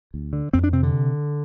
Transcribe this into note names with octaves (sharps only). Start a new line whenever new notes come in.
D2
D3
F2 C4
D4
C3 C4
D3